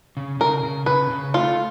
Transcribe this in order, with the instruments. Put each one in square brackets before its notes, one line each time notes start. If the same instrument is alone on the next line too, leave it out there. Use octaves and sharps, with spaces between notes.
[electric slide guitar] C#3
[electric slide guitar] C#3 [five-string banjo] A#4
[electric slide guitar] C#3
[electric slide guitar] C#3 [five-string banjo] B4
[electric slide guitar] C#3
[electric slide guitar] A3 [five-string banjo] F4